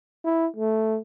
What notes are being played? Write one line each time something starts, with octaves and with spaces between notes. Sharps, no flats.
E4
A3